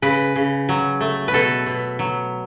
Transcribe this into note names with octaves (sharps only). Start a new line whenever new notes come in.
C#3 B4
C#3
F#3
A3
B4
B2 A4
B2
F#3